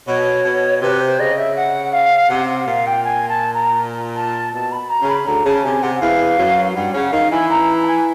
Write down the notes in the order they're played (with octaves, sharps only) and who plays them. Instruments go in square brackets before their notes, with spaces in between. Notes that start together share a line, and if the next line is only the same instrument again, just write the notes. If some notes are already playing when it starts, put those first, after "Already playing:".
[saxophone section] B2 [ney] C#5
[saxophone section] B2
[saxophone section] C3 [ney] B4
[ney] C5
[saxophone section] C#3 [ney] D#5
[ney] E5
F#5
F5
[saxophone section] C3 [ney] F#5
[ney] F#5
[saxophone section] A#2 [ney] F5
[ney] G5
G#5
A5
A#5
A5
[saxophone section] B2 [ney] A5
[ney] B5
A#5
[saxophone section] C#3
[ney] B5
[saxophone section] D2 D3 [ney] A#5
[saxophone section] C#3 [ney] A5
[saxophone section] C3 [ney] G#5
[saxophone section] C3 [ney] F#5
[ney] F#5
[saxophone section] E2 E3 [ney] F5
[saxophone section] F#2 F#3
[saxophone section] G2 G3 [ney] F#5
[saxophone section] C#3 C#4 [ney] F#5
[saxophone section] D#3 D#4 [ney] F5
[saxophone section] E3 E4 [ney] G#5
[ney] A#5
A5
G#5